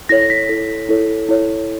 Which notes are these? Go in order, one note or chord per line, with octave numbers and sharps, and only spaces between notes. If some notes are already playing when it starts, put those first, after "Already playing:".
E4 A4 C#5 A#6
B6
E4 A4 C#5
E4 A4 C#5
E4 A4 C#5